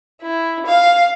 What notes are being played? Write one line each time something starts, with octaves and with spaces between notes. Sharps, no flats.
E4
F5